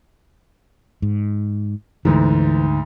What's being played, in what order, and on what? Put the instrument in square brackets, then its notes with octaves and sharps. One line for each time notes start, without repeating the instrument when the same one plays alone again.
[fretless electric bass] G#2
[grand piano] D2 G#2 [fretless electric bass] E3